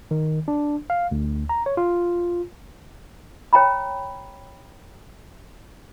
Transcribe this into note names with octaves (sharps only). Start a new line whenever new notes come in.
D#3
D4
F5
D2
A#5
C#5
F4
C#5 G5 A#5 B5